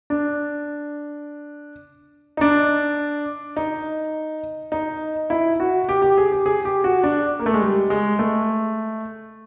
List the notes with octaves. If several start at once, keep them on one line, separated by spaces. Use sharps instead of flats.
D4
D#4
D4
D#4
D#4
E4
F#4
G4
G4
G#4
G4
G#4
G4
F#4
D4
A#3
A3
G#3
G3
G#3
A3